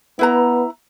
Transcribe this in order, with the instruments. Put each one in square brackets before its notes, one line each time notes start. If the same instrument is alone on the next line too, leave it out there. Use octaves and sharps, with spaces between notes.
[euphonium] B3 [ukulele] E4 B4 A#5